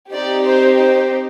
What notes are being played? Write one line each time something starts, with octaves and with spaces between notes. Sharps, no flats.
C4 D#4 G4 D5
C5
C5